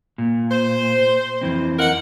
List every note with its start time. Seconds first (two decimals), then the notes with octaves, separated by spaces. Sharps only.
0.18 A#2
0.51 C5
1.41 F2 E3 C4
1.79 D#4 A#4 F#5